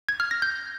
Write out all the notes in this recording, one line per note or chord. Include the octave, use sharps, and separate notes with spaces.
G#6
F6
A#6
G6